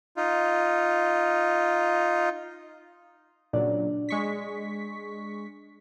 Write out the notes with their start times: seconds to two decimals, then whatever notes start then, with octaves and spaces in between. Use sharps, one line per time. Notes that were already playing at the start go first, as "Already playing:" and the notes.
0.17 D#4 F4
3.53 A#2 C#3 F#3 D4 D5
4.09 G#3 C#6 B6